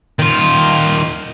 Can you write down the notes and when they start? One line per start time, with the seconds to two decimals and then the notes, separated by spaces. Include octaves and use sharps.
0.19 D#3 F4